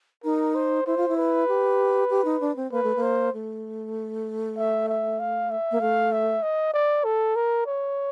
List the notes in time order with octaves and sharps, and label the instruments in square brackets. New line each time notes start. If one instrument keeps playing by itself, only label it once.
[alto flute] D#4 [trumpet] A#4
[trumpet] C5
[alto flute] E4 [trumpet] C5
[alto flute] F4
E4
[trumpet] B4
[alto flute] G4
G4
D#4
D4
C4
[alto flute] A#3 [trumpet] B4
[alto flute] A3
A#3
[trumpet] C5
[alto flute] A3
[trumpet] E5
E5
F5
E5
[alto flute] A#3
[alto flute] A3 [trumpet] F5
[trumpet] E5
D#5
D5
A4
A#4
C#5